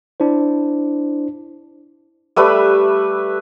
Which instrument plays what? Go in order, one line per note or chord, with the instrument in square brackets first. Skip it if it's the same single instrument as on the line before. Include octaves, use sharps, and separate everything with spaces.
[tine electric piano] D4 E4 C5
[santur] G3 A3 B4 E5